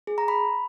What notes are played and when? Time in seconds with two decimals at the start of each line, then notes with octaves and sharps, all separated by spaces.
0.07 G#4
0.18 A#5
0.28 B5